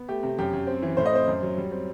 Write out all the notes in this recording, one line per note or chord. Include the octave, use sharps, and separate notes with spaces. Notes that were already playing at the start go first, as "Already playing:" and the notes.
Already playing: B3
A3 G4
C3
F#2 G4
F#2
C4
E3
A2 C5
D#5
C4 C5
F#2
F#3
G3
C4